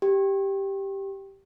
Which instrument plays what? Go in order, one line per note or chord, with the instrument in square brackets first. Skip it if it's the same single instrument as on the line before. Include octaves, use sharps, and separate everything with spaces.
[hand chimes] G4